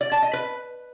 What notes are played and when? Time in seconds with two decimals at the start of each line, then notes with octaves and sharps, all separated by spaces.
0.01 D5
0.12 A5
0.23 D#5
0.33 B4